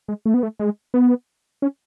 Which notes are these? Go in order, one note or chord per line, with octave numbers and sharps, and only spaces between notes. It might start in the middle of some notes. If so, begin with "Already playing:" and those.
G#3
A3
B3
A3
G#3
B3
C#4